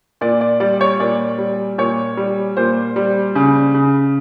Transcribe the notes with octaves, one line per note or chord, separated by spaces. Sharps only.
A#2 D5
D5
G3 D5
C#5
A#2 D5
G3
A#2 C#5
G3
A#2 C5
G3
C#3
C#3